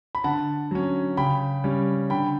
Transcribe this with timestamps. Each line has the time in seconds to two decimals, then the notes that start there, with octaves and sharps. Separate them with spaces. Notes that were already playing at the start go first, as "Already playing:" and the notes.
0.15 B5
0.24 D3 F#5 A5
0.71 F#3 C#4
1.17 C#3 G5 B5
1.64 G3 C#4
2.10 D3 G5 B5